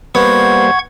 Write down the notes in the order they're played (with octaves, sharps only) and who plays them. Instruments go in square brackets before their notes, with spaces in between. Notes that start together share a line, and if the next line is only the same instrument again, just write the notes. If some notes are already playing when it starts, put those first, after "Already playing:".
[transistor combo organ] G3 A#3 C5 [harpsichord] B3 [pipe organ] F#5 C#6 G#6